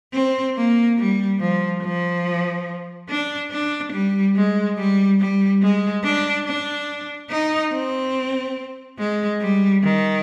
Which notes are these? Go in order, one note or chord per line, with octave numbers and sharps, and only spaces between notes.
C4
A#3
G3
F3
F3
D4
D4
G3
G#3
G3
G3
G#3
D4
D4
D#4
C4
G#3
G3
D#3